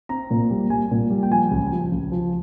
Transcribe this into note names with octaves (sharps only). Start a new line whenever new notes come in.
C4 A#5
A#2
G3
G3 G#5
A#2
G3
G5
F3 G#5
C#2
F3
C#2
F3